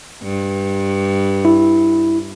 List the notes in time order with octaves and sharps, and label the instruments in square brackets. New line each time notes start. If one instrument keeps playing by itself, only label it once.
[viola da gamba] G2
[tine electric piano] E4